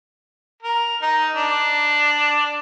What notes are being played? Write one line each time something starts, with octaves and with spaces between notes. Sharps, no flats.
A#4
D#4
D4